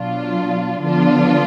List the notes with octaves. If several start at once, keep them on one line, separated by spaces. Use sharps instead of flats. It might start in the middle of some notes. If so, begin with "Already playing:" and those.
Already playing: B2 F#3 D4 F4
D3 F3 B3 D4 F4